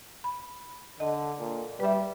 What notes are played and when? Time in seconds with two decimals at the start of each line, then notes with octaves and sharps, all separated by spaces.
0.24 B5
1.00 D3 D#5
1.39 A#2
1.80 G3 B4 E5